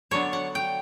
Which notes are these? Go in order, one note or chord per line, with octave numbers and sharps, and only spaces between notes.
D3 F#3 B3 D4 C#5
F#5
G5